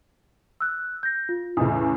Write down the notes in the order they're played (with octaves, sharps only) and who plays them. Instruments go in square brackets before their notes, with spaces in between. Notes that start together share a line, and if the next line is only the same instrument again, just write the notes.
[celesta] E6 F#6
G6 A#6
F4
[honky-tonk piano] E2 A2 C#3 [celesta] D#6